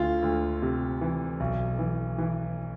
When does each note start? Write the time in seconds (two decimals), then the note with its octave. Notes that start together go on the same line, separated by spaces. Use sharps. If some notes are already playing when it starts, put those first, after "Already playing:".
Already playing: D2 F4
0.22 D2
0.62 C3
1.01 E3
1.40 B1
1.79 E3
2.18 E3